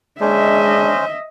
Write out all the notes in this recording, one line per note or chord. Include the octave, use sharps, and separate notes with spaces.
G#3 C#4 D4 C5 D#5 E5